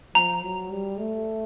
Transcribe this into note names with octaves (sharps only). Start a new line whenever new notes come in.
F3 A#5
F#3
G3
A3